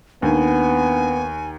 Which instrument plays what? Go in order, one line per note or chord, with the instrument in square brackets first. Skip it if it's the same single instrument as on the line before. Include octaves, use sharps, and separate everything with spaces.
[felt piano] D#2 [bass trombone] B3 [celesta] D4 D#4 [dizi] G#5